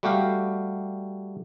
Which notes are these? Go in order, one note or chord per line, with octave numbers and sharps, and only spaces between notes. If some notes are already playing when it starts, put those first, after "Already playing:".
G3 A3 F#4 G4 F5